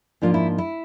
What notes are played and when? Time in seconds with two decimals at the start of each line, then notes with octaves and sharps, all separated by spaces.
0.22 G#2 F3 A#3 D4 F4
0.34 E4
0.58 E4